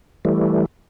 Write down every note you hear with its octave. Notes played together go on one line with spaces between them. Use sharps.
E3 G3 A3